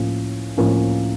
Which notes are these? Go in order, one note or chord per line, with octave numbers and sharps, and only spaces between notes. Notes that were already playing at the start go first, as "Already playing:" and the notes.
Already playing: A2 F3 A#3 C#4
A2 F3 A#3 C#4